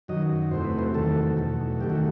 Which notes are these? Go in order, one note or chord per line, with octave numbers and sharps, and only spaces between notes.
F#2 D#3 F#3 D#5
E2 C3 F#3 A3 C5
B4
C5
E2 D#3 F#3 A3 A4
E2 B2 F#3 A3
F#2 D#3 A3 G4
F#4